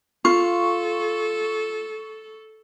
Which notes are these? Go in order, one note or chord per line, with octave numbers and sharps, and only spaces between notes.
F4 A4 C#6